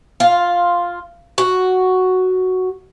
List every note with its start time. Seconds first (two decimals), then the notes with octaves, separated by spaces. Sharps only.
0.20 F4
1.38 F#4